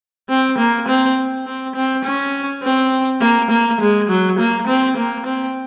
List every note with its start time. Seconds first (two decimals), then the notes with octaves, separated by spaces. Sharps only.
0.29 C4
0.58 A#3
0.88 C4
1.46 C4
1.75 C4
2.05 C#4
2.63 C4
3.21 A#3
3.50 A#3
3.81 G#3
4.09 F#3
4.39 A#3
4.68 C4
4.97 A#3
5.26 C4